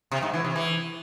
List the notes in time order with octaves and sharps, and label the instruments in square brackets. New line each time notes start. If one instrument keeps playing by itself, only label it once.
[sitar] C3
G#2
E3
C3
E3